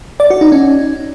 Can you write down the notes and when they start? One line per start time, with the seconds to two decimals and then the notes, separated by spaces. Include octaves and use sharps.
0.20 D5
0.30 F#4
0.41 D#4
0.52 C#4